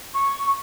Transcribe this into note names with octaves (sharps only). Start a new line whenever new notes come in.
C#6